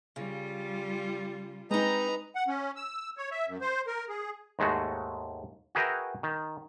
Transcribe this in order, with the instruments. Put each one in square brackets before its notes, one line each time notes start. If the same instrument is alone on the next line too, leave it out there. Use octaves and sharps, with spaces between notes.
[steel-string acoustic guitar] C#3 [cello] G3 F4
[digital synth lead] G#3 [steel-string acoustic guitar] C4 D#4 [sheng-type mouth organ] B4 D#5 A#5
[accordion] F#5
C#4
E6
C#5
E5
F#2
C5
A#4
G#4
[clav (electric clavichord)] D#2 G#2 G#3 A3 F#4
F#4 G#4 A#4 B4 E5 G5
D#3